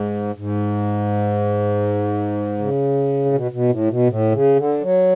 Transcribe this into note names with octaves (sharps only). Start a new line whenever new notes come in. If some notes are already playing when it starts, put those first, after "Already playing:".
Already playing: G#2
G#2
C#3
A2
B2
B2
A2
B2
A2
C#3
D3
F#3